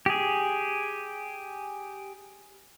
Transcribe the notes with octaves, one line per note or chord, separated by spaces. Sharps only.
G4 G#4